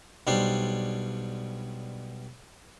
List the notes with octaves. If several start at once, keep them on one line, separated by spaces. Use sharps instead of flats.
B1 G3 D4 C5